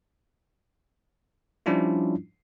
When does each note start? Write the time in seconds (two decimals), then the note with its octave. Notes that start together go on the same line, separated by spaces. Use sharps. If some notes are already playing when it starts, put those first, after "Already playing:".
1.66 F3 G3 C#4 D4 E4 F4